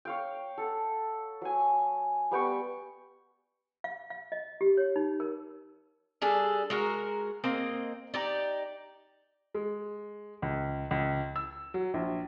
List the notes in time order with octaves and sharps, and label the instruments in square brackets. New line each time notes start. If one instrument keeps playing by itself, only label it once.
[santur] C#5 F5 G5
A4 F#5
F#3 G#5
G3 B3 G5 C#6
[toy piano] F5
F5
D#5
G4
C#5
D#4
A#4
[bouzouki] G3 D4 G#4 A4
G#3 F#4 A#4
A#3 C4 D#5
D#4 G4 D5
[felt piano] G#3
C#2
C#2
E6
F#3
A#1